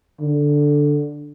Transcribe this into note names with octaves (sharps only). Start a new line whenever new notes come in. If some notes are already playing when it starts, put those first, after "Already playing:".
D3